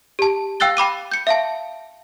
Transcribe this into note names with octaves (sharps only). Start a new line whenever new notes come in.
G4 A5
F5 G5 E6 F#6 A6 G7
G5 B5 D6 D#7
G6 C#7
E5 F5 A5